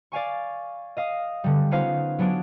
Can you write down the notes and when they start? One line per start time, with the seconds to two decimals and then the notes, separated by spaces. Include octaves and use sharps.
0.12 D5 F5 G#5 C#6
0.97 D#5 F5 D#6
1.44 D3 G3
1.71 B3 C#4 D#4 F4 C5 F5
2.19 F#3 B3 D4 G#4 D7